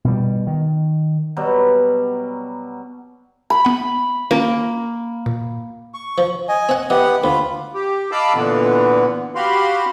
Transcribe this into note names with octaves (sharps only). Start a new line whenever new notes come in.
B2 G3
D#3
B2 F#3 G3
B5
B3 F#5
A#3 C#4 A#4
A#2
C#6
F3
D#5 G#5
C4 F#5
E3 B3 G4 D#5 F#5
D2 F4 B5
G4
D#5 F5 A5 B5 D6 E6
A#2 D3 E3 B3
F#4 G4 F5 B5 C6